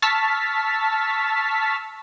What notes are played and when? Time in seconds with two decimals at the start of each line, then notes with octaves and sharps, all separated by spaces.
0.02 A5 C#6 E6 F6 A6 B6